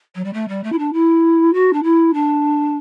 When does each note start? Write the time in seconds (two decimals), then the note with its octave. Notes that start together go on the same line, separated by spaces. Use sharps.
0.15 F#3
0.24 G3
0.33 A3
0.48 G3
0.63 A3
0.72 E4
0.78 D4
0.93 E4
1.53 F#4
1.73 D4
1.83 E4
2.13 D4